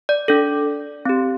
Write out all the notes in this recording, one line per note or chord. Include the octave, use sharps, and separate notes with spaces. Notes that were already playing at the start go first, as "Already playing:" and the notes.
D5
D4 A4
C4 G4